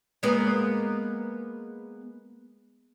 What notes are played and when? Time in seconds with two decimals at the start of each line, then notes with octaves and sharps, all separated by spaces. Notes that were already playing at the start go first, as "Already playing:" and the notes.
0.23 G#3 A#3 B3